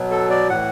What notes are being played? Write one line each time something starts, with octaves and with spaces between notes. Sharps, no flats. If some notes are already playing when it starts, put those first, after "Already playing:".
Already playing: B2 F#3
A4
D5
A2 E3 F#5